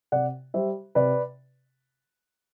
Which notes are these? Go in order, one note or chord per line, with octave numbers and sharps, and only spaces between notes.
C3 D5 F#5
G3 C5 E5
C3 B4 D5